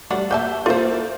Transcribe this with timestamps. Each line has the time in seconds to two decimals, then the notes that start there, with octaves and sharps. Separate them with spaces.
0.10 G3 A3 D4 F#4
0.31 A#3 E5 G#5 A5 G6
0.66 A#3 E4 F4 A4 C5